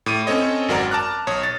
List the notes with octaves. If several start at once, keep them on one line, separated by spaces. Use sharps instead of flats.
A2 D6 D#7
C4 C#4 A4 C#5 D#5
G#1 F#2 F#4 A#4 D5 A#5
A5 A#5 D6 F6 F#6
B1 C#5 D#6
A6